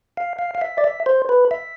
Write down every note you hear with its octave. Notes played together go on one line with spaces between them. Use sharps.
F5
F5
F5
E5
D5
E5
C5
B4
E5